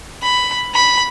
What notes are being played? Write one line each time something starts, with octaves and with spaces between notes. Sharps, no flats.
B5
B5